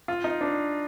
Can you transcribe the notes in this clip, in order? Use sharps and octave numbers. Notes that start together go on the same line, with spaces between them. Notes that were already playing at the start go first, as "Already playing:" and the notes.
F4
D#4
D4